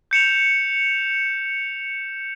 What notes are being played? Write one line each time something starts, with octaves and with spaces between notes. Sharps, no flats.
G6 C#7 E7 F7